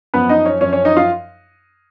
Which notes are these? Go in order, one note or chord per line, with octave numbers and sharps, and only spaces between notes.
F#2 F3 B3 B4
D#4 D#5
C#4 C#5
F#2 F3 C#4 C#5
C#4 C#5
D#4 D#5
F4 F5